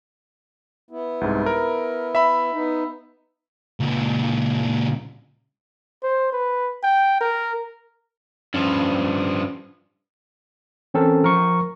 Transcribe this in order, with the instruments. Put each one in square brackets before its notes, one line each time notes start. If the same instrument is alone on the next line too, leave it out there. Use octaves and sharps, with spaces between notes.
[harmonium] B3 E4
[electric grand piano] C2 G#2
A#4
E5 B5
[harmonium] B3 D#4
[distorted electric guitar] C#2 A#2
[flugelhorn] C5
B4
G5
A#4
[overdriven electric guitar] G2 F3 [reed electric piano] C#4
[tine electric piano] E3 C4 C#4 A4 A#4 C5
F3 A#4 A#5 C#6